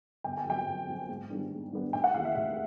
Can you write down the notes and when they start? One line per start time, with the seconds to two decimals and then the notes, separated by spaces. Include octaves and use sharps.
0.24 G1 G5
0.37 G#5
0.46 F2 C#3 F#3 G5
0.67 G1
0.88 F2 C#3 F#3
1.09 G#2
1.30 D#3 G3 B3 D4
1.51 G#2
1.72 D#3 G3 B3 D4
1.93 F1 G5
2.04 F#5
2.14 D#2 C#3 E3 F5
2.25 E5
2.35 F1 E5